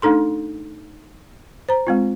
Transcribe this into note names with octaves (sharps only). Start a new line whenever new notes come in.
A3 D4 D#4 A4 C6
C5 A#5
G#3 C4 F4